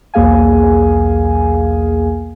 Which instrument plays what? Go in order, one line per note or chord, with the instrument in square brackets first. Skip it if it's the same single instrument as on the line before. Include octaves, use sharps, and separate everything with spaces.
[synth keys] B1 E2 A#3 G#4 F5 G#5